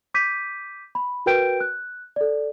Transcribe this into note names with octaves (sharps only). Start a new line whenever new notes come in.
D6 G6 B6 D#7
B5
F#4 A#4 B4 G5 G6 D7
F#6
A4 D5